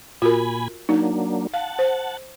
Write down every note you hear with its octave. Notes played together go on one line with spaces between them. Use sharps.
A#2 F4 F#4 A#4 G#5 B5
F#3 A#3 D4 D#4
F5 F#5 A5
C5